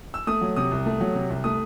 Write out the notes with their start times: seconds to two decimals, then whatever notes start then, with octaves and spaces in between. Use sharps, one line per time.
0.14 E6
0.27 A3 D#6
0.41 F#3
0.56 C3 D#6
0.72 C2
0.86 A3
1.00 F#3
1.15 C3
1.30 C2
1.44 A3 D#6